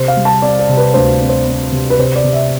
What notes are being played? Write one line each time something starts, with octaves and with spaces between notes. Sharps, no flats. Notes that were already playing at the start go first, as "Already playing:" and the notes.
Already playing: C3 C5
F5
G3
A5
C4 D5
D5
C3
B4
D2 C5
C4
C5
C4
C3
B4
C3 C5
D5
C3
E5